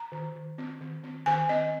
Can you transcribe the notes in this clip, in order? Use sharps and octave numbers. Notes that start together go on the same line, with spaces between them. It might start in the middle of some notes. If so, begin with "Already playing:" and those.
Already playing: A#5
D#3
D#3
C4
D#3
C4
D#3 G#5
C4 D#5